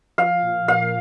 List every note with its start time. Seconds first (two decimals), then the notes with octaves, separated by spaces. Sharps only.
0.18 F3 F5
0.42 A#2
0.68 A#3 F5